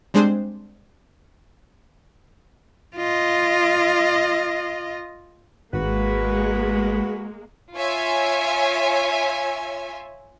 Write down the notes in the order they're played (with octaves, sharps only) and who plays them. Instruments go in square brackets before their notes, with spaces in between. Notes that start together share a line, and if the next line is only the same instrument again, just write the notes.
[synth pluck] G3 G#3 C4 D4 G#4 C5
[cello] F4 D#5
[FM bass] G#1 [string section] G#3 A#3 [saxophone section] F#4 B4
[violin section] F4 C#5 E5 G#5